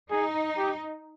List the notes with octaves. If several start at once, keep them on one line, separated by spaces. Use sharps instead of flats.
D#4 G#4
G4